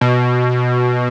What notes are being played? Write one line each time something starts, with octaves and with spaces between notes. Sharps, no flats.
B2